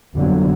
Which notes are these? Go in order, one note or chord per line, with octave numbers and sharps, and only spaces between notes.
G1 F2 D3 F#3